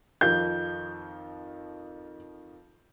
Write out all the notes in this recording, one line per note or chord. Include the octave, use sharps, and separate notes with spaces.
F2 D#3 F3 G6